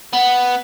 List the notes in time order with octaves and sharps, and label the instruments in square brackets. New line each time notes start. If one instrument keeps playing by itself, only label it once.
[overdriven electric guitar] B3